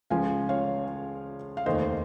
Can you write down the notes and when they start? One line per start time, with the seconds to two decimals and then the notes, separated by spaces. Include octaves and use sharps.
0.10 C#2 C#3 F3 F5 G#5
0.49 C#5 F5
1.57 F5
1.66 F1 D#2 D#3 C5 D#5
1.81 C5